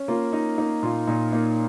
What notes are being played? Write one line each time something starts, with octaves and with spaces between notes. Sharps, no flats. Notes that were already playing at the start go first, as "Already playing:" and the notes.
Already playing: C#4
A#3 F4
D#4
A#3 D#4
A#2 F4
A#2 D#4
A#3 D#4